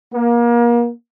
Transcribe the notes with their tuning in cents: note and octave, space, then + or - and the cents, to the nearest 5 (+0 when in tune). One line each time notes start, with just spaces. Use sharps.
A#3 +30